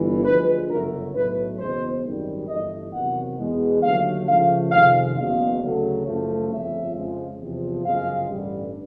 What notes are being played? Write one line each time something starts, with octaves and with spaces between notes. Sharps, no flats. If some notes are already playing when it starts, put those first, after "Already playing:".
Already playing: G1 E3
D2 D3 F3 G#3 B4
G1 F#2 C#3 F#3 A3 A#4
B1 A2 F#3 A3 B4
F#1 E2 B2 G#3 C5
G#1 F#2 D#3 G3
G1 G2 E3 A3 D#5
E2 C3 D#3 F#3 F#5
E2 B2 G#3
D#2 D3 F#3 A3 F5
C#2 C#3 F3 A3 F5
F2 C3 D#3 G#3 F5
F#1 E2 B2 F5
D2 C#3 F#3 A3
F#1 F#2 C#3 F3 A3
G1 F2 C#3 F3 E5
F2 C#3 F3 G#3
E2 C3 F3
G1 F#2 C#3 F3 G#3 F5
A1 G2 D3 G3